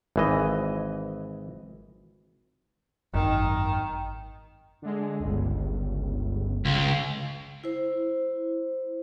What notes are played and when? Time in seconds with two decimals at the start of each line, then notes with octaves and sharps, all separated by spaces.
0.16 G#1 E3 D#5
3.13 G#1 F#2 D#3
4.82 D3 G#3
5.20 G1 C#2
6.65 C#2
7.64 E4 C5